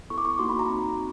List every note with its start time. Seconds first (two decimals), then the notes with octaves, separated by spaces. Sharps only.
0.10 B3 E4 A4 C#6
0.18 D6
0.25 C#6
0.39 A#3 D#4 F#4 C6
0.49 B5
0.59 A#5
0.69 C4 D#4 F#4